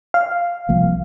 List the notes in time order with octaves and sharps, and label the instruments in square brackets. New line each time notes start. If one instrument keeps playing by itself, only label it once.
[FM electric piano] F5
[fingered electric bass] C2 F3 A#3